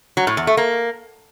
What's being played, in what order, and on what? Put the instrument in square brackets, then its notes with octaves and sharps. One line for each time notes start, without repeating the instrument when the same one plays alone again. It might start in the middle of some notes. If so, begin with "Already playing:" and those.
[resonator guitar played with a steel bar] F#3
A2
E2
A3
A#3